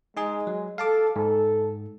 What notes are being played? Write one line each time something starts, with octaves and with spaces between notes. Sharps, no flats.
G#3 D#4 G#4 G#5
F#3
A4 F5 A5 D6
G#2 A4